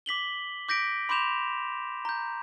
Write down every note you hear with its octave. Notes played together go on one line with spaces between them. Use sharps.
D6 B6 F#7 G7
D6 G6 A#6 B6 D7
B5 C6 D6 G6 E7 F7
A#5 G6